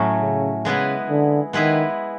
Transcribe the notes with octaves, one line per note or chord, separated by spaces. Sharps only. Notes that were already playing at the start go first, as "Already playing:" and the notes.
Already playing: A2 F#3 A3 C#4
C#3
C#3 G#3 B3 E4 G#4 B4
D3
D#3 G#3 B3 E4 G#4 B4